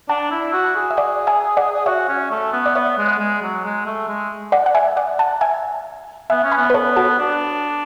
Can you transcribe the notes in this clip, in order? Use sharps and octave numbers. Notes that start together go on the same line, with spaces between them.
D4 F#5 A5
E4
F#4
G#4
E5
D5 F#5
E5 G#5
D5 F#5
F#4 C#5 E5
C#4
A3
B3
D5
B3 C#5 E5
G#3
G#3
F#3
G#3
A3
G#3
D5 F#5
F#5
E5 G#5
D5 F#5
F#5 A5
E5 G#5
B3 E5 G#5
C#4
G#5 B5
B3
B4
A4 C#5
F#4 A4
D4